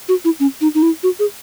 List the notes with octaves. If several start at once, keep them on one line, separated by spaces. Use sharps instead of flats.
F#4
E4
C#4
D#4
D#4
E4
F#4
G#4